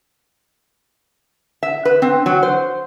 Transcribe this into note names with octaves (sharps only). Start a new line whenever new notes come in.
E5
B4
C4
F#3
C5